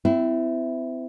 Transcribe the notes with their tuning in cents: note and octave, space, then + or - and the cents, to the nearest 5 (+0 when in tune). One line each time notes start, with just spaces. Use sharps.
C4 -40 E4 +0